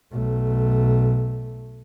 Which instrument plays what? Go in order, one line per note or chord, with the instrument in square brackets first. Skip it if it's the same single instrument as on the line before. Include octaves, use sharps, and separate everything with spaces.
[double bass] B1 A3